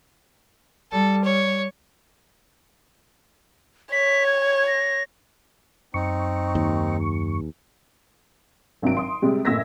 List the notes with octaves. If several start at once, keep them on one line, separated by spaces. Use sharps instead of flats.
G3 A4
C#5
C#5 B6
G#6
A#6
F#2 C4 D#4 C#6
D#2
G#1 G2 C3 F#3 D7
C6 D#6
C3 G3 G#3
F#1 A2 E6 G#6 A#6 B6